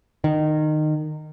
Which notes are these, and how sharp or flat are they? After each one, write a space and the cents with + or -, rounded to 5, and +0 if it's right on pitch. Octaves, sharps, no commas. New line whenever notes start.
D#3 -20